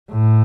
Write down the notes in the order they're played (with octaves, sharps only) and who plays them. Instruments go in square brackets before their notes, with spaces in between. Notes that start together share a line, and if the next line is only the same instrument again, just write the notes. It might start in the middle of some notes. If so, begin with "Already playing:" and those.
[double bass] A2